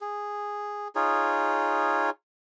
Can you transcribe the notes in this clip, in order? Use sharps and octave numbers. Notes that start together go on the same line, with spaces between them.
G#4
D#4 F4 G#4 C#5